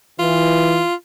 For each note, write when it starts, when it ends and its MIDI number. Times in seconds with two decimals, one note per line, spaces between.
0.19 0.81 52
0.19 0.94 65